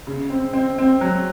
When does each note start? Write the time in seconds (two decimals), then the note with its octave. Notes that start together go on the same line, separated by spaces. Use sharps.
0.07 C#3
0.30 C4
0.53 C4
0.78 C4
1.01 F#3